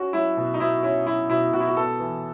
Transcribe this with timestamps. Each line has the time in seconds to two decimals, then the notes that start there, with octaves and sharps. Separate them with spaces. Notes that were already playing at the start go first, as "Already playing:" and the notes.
Already playing: C#4 F#4
0.13 F#3 E4
0.37 B2
0.54 D#4
0.60 B2 E4
0.83 C#4 E4
1.06 F#3 E4
1.30 B2 E4
1.53 B2 F#4
1.60 E4
1.67 F#4
1.77 B3 A4
2.00 E3